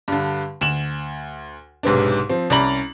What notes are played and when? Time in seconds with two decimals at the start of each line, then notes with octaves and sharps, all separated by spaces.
0.08 G2 D3
0.61 D2 E7 F#7
1.83 B1 G#2 C3 B3 D4
2.30 F3 C4
2.50 C2 C#4 D5 A#5 B5 F#7